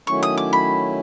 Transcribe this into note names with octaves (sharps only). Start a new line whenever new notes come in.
D#3 F#3 A3 C#4 E4 C#6
D#6
D6
B5